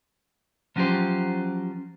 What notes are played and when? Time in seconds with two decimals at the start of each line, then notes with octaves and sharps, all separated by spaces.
0.76 F3 F#3 C#4 F4 G4 C5